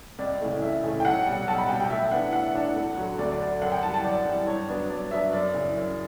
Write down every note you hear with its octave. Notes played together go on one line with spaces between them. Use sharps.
C#2 D5
C#3 E3 A3
C#2 E5
C#3 E3 A3
G5
B1 F#5
B2 G3 G5
B1 A5
B5
B2 G3 G5
G5
A2 E5
E3 B3 D4 F#5
A2 F#5
E3 B3 D4
D2
D3 F#3
D2 D5
D5
D3 F#3 D5
F#2 F#5
G5
E3 G3 A5
A5
F#2 D5
E3 G3
G2 C#5
F#3 B3 D4
G2 D5
F#3 B3 D4 E5
F#2 D5
C#3 E3
F#2